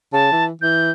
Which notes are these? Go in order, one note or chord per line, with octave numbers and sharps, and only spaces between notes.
C#3 A5
E3
E3 G6